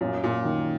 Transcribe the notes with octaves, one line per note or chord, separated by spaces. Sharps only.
F#2 A#2
A#2
D#3